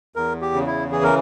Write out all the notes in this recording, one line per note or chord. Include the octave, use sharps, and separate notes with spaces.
E2 A#4
G4
C#3
E4
E3 G#4
A#4